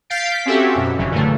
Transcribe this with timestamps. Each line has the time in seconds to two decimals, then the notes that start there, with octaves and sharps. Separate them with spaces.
0.10 F5 G6 A6 B6 C7 D7
0.30 B6
0.46 C4 C#4 F#4 G4 A4 E5
0.75 F#2 B2
0.98 G1 C#3 E3 F#3
1.11 A#2 D3 E3 A3